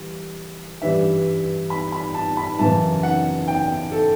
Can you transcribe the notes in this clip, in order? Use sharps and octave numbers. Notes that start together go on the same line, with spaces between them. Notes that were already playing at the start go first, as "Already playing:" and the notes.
Already playing: E3 G3
G2 E3 G3 E5
B5
B5
A5
B5
F#2 C#3 E3 A5
F#5
G5
A4